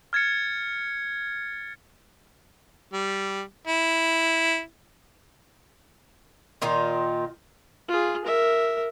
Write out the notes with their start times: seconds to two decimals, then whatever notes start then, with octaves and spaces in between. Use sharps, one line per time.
0.13 F6 G#6 A6 C#7
2.93 G3
3.68 E4
6.62 A#2 D#3 F4
7.88 F4 G#4
8.25 A#4 E5